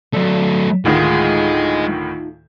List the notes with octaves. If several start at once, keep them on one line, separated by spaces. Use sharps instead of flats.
F#3 A3 D5
D2 A2 D#3 G#3 A3 D#4 F4